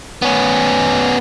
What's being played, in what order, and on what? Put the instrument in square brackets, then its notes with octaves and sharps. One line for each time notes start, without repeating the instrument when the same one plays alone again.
[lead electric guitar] B3 C#4